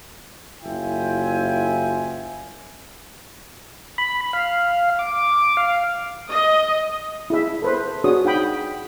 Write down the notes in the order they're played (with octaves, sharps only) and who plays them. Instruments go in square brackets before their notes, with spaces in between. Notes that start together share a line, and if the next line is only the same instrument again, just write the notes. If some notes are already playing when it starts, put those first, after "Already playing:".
[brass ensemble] F#1 E4 F4 E5 G5 G#5
[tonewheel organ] B5
F5
D6
F5
[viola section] D#5
[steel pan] E4 G#4 E5
A4 B4 C5
D4 F#4 G#4 C#5 D#6
D#4 F#5 G5 B5 D#6